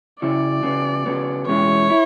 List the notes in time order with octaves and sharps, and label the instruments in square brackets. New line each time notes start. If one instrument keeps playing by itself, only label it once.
[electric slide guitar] C#3 F#3 C#4 E4 [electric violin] D5
[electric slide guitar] C#3 F#3 B3
C#3 F#3 B3
[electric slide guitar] E2 B2 G#3 C#4 E4 [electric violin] C#5
[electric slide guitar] E4